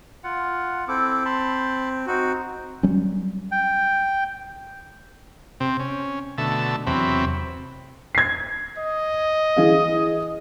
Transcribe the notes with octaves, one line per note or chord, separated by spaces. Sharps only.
F4 F#5
C4 E4 A4 D6
A5 B5 C6
C4 D#4 F#4
F#3 G3 C#4
G5
C3 C4
C#4
B2 D3 A3 E5 A5
E2 C3 F#3 C4 E5 B5
G#6 C7
D#5
E3 G#4 F5